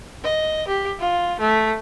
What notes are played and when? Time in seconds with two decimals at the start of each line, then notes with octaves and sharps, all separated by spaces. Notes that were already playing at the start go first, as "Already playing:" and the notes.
0.24 D#5
0.67 G4
0.99 F4
1.39 A3